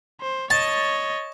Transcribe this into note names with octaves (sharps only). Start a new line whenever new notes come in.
C5
C#5 D#5 A5